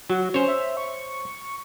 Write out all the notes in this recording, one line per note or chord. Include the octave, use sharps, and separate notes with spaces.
F#3 F#4
C#4 C5 C#5
E5
C#6